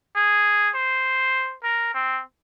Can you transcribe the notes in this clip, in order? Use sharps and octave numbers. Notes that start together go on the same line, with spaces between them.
G#4
C5
A#4
C4